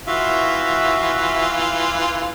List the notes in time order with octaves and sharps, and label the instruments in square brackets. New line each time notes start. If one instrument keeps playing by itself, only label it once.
[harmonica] E3 F4 [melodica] F#4 E5